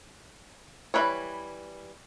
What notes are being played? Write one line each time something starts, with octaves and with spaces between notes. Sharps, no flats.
E3 G3 F4 B4 C#5